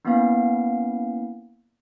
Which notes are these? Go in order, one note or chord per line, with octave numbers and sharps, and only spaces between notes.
A#3 B3 C#4 E4 F5